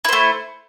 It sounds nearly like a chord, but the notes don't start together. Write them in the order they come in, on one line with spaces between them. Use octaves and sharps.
E4 C5 A3